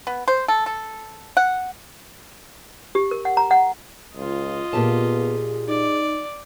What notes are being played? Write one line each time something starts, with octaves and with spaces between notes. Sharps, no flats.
B3
C5
A4
A4
F#5
G4
A#4
F#5
A#5
F#5
C#2 F4 D#5
A#2 B3 G4 G#4 A5
D#4 D5